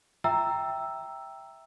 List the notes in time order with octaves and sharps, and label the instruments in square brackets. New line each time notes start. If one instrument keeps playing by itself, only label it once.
[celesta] E5 G5 A#5 E6